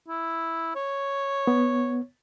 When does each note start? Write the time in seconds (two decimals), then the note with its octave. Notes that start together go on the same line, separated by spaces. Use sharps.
0.09 E4
0.75 C#5
1.47 B3